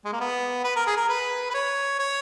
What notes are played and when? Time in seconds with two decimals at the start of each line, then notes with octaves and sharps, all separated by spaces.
0.04 G#3
0.13 A#3
0.20 B3
0.64 B4
0.76 A#4
0.87 G#4
0.97 A#4
1.09 B4
1.50 B4
1.54 C#5
1.99 C#5